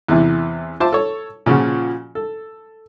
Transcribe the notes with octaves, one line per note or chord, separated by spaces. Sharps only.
E2 C3 E3
F4 C5 E5 A5 D6
A4 C#5
A#2 C#3 F3 F#4
A4